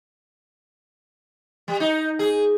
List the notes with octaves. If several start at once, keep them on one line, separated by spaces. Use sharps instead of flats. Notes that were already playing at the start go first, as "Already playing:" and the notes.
G3
D#4
G#4